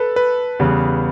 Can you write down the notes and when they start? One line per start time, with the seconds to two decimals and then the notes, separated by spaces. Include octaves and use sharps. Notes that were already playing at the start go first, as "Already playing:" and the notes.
Already playing: A4 B4
0.16 B4
0.59 E2 C#3 G3